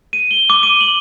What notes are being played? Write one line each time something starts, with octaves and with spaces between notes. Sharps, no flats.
D#7
G7
D6
D#7
F#7